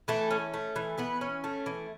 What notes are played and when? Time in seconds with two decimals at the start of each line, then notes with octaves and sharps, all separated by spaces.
0.08 E3 A3 A4
0.31 C#4
0.54 A3
0.76 E3
0.98 E3 B3 B4
1.21 C#4
1.44 A3
1.66 E3